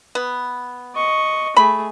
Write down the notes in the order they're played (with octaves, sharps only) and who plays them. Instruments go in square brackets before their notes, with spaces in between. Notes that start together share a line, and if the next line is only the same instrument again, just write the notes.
[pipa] B3
[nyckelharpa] D#5 C#6
[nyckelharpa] A3 G#4 [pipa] B5